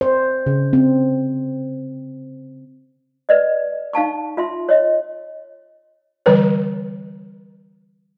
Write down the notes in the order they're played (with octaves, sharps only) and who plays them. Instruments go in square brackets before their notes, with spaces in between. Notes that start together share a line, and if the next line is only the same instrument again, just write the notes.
[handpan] C5
C#3
C4
[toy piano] B4 D5 D#5
D#4 F5 A5 C#6
F4 E5 C6
C#5 D#5
[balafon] D3 E3 G3 B4 C#5